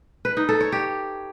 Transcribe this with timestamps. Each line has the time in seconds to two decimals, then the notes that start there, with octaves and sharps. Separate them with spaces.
0.25 B4
0.37 D#4
0.49 A4
0.61 C#5
0.72 G4